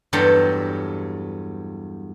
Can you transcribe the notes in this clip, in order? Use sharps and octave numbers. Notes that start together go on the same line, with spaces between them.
E2 G2 F#3 A4 G5 C6